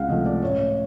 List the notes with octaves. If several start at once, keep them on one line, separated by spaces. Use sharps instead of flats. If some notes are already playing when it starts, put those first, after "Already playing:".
Already playing: C#2 F5 F#5
C3 F3 A3 D#5
D5
A1 C#5